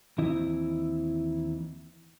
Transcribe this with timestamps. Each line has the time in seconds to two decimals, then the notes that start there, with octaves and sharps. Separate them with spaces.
0.18 D#2 E3 C4 E4 D#5